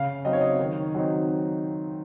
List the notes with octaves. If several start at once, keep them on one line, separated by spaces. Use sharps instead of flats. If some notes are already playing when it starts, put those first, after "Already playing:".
Already playing: C#3 F5
F#3 C4 D#4 D#5
C#5
D#5
D#3
F#3 C4 D#4